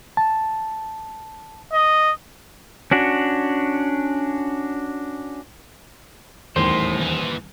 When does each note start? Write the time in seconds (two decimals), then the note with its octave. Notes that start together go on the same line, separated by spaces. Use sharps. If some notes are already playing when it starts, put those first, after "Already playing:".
0.17 A5
1.73 D#5
2.91 C#4 D4 F#4
6.56 D#1 E2 A2 D#3 C5
6.98 D#2 E3